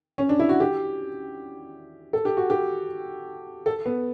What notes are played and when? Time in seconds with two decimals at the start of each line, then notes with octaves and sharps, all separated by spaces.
0.18 C#4
0.29 D4
0.39 E4
0.49 F#4
0.60 G4
2.13 A4
2.25 G4
2.37 F#4
2.50 G4
3.66 A4
3.86 B3